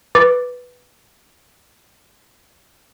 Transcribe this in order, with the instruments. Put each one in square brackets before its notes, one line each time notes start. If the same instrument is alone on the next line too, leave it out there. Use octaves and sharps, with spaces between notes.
[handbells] B4 D6 A6